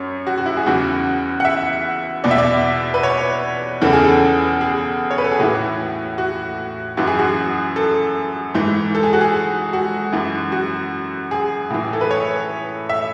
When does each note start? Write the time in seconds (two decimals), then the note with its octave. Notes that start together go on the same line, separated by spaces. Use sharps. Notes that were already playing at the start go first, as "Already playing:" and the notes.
Already playing: F#2 C#5
0.27 F#4
0.38 F#4
0.46 E4
0.57 G#4
0.66 E2 C#3 E3 F#4
1.40 F#5
1.45 E5
2.24 E2 B2 D5
2.31 E5
2.38 D5
2.94 B4
3.03 C#5
3.82 E2 C#3 E3 A4
3.93 G#4
4.04 A4
4.61 G#4
5.11 C#5
5.18 B4
5.24 A4
5.31 G#4
5.40 A2 E3 F#4
6.18 F#4
6.97 F#2 E3 F#4
7.07 G#4
7.19 F#4
7.76 A4
8.54 G#2 E3
8.95 A4
9.03 G#4
9.13 F#4
9.21 G#4
9.73 F#4
10.12 F#2 E3
10.52 F#4
11.31 G#4
11.70 A2 E3
11.93 A4
12.01 B4
12.11 C#5
12.89 E5